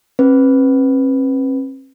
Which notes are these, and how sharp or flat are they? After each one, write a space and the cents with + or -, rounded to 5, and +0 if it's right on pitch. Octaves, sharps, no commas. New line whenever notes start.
C4 +45 B4 +0